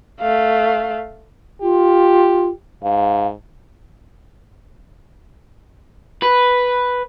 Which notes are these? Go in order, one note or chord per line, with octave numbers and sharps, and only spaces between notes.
A3 F5
F4 G4
G#2 F5
B4